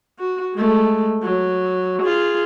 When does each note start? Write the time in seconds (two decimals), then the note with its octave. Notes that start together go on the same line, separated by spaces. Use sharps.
0.19 F#4
0.54 G#3 A3
1.23 F#3
2.02 F4 G#4